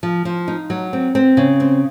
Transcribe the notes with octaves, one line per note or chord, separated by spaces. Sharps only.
F3
F3
D#4
F#3
C4
C4
C#3
C4